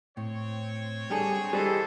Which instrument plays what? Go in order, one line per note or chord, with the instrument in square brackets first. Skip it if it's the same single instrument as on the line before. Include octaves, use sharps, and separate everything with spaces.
[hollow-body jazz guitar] A2 [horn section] C4 C#5
[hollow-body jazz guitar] G3 D4 A4 [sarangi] G#4
[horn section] E3 C5 D#5 [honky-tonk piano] G3 [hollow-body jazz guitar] G#4 [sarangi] A4